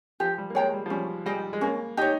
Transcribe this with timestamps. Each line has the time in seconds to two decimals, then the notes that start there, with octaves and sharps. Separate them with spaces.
0.20 F3 G4
0.38 G3
0.50 A#3
0.55 G#3 C#5 G5 A#5
0.74 G3
0.86 F3
0.90 G3 C#4
1.26 G3 G#4 D#5 G5
1.53 G#3
1.61 A#3 C#4
1.97 D#4 G4
2.01 C#5